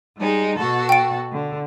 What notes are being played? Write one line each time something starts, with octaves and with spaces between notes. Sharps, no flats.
G3 G#3 D#4
B2 F#4 A4
G5 D7
D3